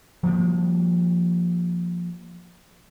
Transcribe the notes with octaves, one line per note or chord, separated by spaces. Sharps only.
F3 G3 A#3